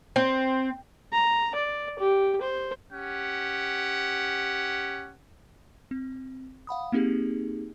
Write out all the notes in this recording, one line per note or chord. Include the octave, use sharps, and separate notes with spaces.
C4
A#5
D5
G4
C5
C#4 G4 F#5
C4
F5 F#5 B5 D#6
A#3 C4 D#4 G4 G#4